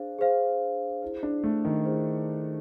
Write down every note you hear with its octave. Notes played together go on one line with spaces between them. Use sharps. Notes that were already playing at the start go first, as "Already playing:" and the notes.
Already playing: D4 G#4 C5 F5
G#4 C5 F5
E4 G#4 C5
D4
A3
D#3
E4 G#4 C5